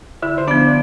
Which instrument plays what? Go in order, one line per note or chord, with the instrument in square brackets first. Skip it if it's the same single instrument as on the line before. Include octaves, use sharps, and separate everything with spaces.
[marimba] D3 [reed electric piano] E4 E5
[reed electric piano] C5
[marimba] F3 B3 [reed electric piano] D4 D5